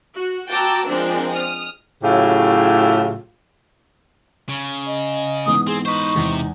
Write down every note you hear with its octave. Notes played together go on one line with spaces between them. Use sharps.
F#4
F#4 G5 A5 A#5 D6 E6
F3 G#3 C4 D4 A#4
D#6 F6
A2 C#3 F#3 E4 F4 G4
C#3
D#5
G#2 E3 B3 D#6
C4 G#4
D#4 B4 C5 C#6
E2 G#2 C3